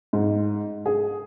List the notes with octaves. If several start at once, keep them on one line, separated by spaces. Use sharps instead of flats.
G#2
G#4